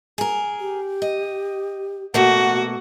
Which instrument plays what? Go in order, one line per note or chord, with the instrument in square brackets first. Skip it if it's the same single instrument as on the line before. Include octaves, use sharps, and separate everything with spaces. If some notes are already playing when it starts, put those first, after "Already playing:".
[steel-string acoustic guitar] G#4 A#4
[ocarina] G4
[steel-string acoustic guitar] D#5
[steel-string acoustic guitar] B2 A3 A#3 [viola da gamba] F#4 [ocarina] F#5